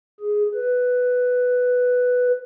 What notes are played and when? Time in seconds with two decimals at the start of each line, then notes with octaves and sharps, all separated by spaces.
0.20 G#4
0.54 B4